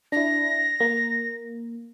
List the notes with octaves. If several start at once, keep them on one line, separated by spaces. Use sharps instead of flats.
D4 E4 A#6
A#3